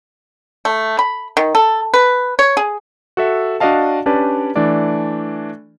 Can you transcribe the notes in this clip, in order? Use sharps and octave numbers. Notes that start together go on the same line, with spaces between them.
A3
B5
D#3
A4
B4
C#5
G#4
F#4 A4 E5
D4 F#4 D5 D#5 F5 A5
C#4 D4 G4 B4 D5 A5
E3 A3 D4 D5